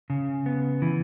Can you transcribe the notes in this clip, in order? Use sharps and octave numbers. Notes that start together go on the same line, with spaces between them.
C#3
B3
E3